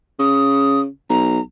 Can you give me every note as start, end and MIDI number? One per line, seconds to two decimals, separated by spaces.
0.19 0.86 49
0.19 0.80 87
1.10 1.39 35
1.10 1.41 82